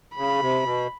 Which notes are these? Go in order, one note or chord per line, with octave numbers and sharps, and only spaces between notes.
C#3 B5
C3
B2